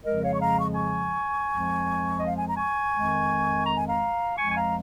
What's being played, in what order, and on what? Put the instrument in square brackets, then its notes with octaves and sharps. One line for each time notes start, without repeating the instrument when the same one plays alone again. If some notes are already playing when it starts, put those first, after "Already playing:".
[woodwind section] F2 C#3 F3 G#3 A#4 D#5
C#5 F5
C#6
F5 A#5
C#6
G#5 C#6
F2 F3 G#3
D#5
F5
G#5
A#5
G#5 C#6
F2 D#3 G#3
A#5
G#5
F5 A#5
F2 F3 G#3 G#5 C#6
G#5
F5 A#5